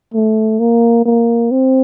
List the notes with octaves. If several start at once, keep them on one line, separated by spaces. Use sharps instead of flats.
A3
A#3
A#3
C4